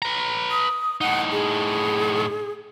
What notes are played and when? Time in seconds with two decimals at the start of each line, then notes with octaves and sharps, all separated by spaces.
0.02 B4 A#5
0.51 D#6
1.01 A2 D#4 F#5
1.32 G#4